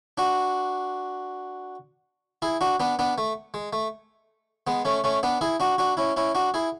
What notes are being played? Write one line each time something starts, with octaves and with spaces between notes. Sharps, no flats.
D4 F#4
E4 G#4
D4 F#4
B3 D4
B3 D4
A3
G#3
A3
G#3 B3
A3 C#4
A3 C#4
B3 D4
E4 G#4
D4 F#4
D4 F#4
C#4 E4
C#4 E4
D4 F#4
E4 G#4